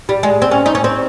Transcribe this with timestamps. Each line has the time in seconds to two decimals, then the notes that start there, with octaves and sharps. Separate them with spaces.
0.09 G3
0.23 G#3
0.42 C4
0.51 C#4
0.66 D#4
0.75 C#4
0.84 C4